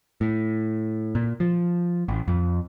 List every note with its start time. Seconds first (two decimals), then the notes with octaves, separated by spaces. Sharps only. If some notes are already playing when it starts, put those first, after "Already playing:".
0.21 A2
1.15 A#2
1.40 F3
2.08 A1
2.28 F2